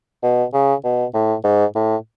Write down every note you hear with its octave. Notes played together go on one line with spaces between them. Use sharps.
B2
C#3
B2
A2
G#2
A2